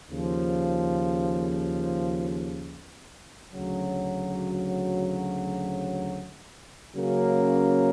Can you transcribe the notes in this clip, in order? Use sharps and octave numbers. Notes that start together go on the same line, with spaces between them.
D#2 C#3 F3
D2 C#3 F#3
C#3 F#3 A#3 C#4